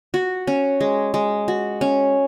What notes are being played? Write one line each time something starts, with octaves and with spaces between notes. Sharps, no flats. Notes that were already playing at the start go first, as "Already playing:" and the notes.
F#4
C#4
G#3
G#3
F#4
C#4